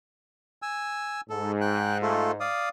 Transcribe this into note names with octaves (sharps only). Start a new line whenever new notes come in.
G#5 E6
G#2 A4
G5 F#6
A3 F4 A4
D5 F5 D#6